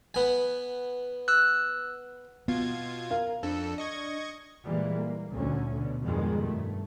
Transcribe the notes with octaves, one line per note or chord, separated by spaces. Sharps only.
B3 G#5
E6 F#6
B2 B3 F4 G#6
A#4 F5
F2 D4 A4
D#5 C#6 G#6
A#2 E3 G3 G#3 A#3
A#3
D2 A#2 D3 C#4
B2 D3
F2 G#2 B2 D#3 G3 G#3
G2 A3